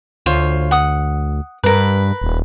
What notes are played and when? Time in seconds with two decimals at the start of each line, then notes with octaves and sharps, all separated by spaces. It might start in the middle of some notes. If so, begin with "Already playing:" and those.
0.26 D2 F4 C5 C#5
0.71 F#5 D#6
1.64 G2 A#4 B4
2.21 D#1